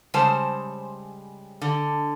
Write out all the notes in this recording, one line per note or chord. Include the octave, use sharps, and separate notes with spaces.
C#3 G3 G#3 C5 A5
D3